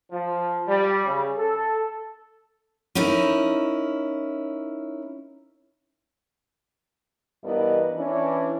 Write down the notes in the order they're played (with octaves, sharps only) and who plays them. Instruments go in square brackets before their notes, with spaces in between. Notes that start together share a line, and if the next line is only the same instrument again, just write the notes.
[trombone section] F3
G3
C#3
A4
[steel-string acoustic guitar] C#4 D#4 E4 A#4
[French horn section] G2 E3 B3 A#4 B4 D#5
E3 C#4 D4